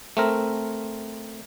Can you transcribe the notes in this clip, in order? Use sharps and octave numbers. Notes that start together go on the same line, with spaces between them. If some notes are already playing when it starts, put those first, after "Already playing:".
A3 C4 A#4